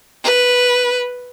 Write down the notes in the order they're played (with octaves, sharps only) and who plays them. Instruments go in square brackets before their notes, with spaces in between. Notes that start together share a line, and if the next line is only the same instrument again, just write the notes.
[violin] B4